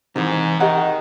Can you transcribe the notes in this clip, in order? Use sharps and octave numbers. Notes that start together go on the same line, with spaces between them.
G#2 C3 D#3 E3
D#3 G4 D#5 F#5 A#5